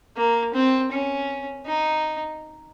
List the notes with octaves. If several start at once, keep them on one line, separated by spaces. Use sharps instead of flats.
A#3
C4
C#4
D#4